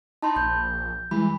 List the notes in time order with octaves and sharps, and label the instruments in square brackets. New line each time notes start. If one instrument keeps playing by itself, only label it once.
[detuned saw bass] D#4 [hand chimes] A5 B5 C6
[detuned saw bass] A#1 [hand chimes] G6
[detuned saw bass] E3 [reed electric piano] G3 G#3 [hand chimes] B5